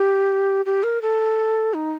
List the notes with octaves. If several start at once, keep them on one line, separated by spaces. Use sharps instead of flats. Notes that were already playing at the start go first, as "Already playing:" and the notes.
Already playing: G4
G4
A#4
A4
D#4